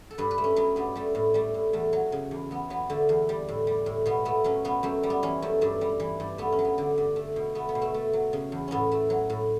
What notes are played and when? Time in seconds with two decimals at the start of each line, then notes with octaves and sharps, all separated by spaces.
0.11 A4
0.18 G2 B4
0.31 B4
0.38 A3
0.44 C#4
0.56 F#3 B3
0.76 G2 B3
0.95 G3 A3
1.15 A2
1.34 G3 A3
1.54 A2
1.73 E2 A3
1.93 F#3
2.12 C#3
2.31 E2
2.51 E2 B3
2.70 F#3 B3
2.90 D3 A3
3.09 E2
3.29 G3
3.49 A2
3.67 G3
3.86 A2
4.06 B2 B3
4.25 A3 B3
4.44 F#3 C#4
4.65 B2 B3
4.83 F#2 A3
5.03 G3
5.10 B3
5.23 E3 C#4
5.42 F#2 A3
5.61 G2 A3
5.81 G3
6.00 E3
6.20 G2
6.38 A3 B3
6.52 C#4
6.59 F#3
6.65 B3
6.78 D3
6.98 G2
7.16 A3
7.36 B2
7.55 A3 B3
7.69 B3
7.75 B2
7.82 A3
7.94 A3
8.13 F#3
8.33 C#3
8.52 E2
8.68 A2 B3 C#4
8.92 A3
9.10 F#3
9.30 A2